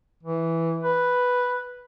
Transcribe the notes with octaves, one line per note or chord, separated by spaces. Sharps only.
E3
B4